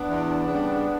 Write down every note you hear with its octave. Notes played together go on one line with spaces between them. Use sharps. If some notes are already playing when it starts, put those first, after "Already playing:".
Already playing: B3 D4
E2
C#3 G3